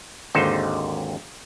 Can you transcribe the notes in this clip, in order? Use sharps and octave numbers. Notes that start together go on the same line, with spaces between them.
G#1 D#2 D3 D#4 C5